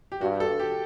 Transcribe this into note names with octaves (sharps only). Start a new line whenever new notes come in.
G4
G2 F#4
A4
G4